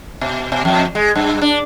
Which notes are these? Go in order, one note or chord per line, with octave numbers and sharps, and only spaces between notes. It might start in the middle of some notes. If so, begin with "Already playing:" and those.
B2
B2
F2
G#3
G2
D4